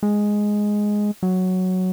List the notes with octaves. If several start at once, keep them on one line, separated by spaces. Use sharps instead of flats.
G#3
F#3